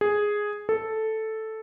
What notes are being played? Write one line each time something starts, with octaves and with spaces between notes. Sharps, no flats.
G#4
A4